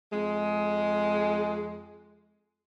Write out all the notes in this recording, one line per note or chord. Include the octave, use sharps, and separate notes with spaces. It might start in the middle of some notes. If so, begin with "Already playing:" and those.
F2 G#3